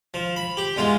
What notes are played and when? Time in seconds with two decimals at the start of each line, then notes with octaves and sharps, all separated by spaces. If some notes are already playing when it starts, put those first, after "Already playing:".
0.14 F3
0.36 B5
0.57 G4
0.76 E2 G#3 F4